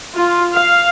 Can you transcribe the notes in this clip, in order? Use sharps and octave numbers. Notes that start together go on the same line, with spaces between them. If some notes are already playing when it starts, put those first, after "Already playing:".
F4
F5